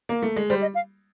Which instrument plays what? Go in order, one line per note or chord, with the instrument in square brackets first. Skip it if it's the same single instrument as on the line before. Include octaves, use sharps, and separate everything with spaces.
[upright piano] A#3
A3
G#3
[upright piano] G3 [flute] C5
[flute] D#5
F5